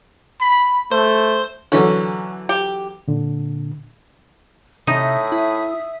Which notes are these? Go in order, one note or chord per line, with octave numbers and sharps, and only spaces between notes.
B5
A3 C5
D3 E3 F#3 C#4
G4
A#2 D3
A2 C3 D#4 E5 D#6
E4